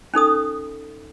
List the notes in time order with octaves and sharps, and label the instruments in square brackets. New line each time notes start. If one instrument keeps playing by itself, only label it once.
[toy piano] C#4 D#4 A4 D#6